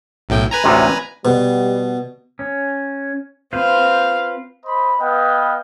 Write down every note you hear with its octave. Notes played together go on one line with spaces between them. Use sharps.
B1 A2 G5
B4 G#5 A#5
A1 D2 C3
B2 G3
C#4
C4 F4 B4 C5 F5
C5 D#5 B5
B3 B4 D#5 F5 G5